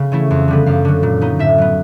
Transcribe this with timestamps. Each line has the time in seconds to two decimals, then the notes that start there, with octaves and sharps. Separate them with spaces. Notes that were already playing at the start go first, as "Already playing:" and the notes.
Already playing: C#3 B3
0.12 E3 A3 C#4 E4
0.31 F2
0.48 D3 G3 B3
0.66 F#2 F5
0.85 D3 F#3
1.03 A#2
1.21 F#3 B3 D#4
1.39 A2 E5
1.58 F#3 B3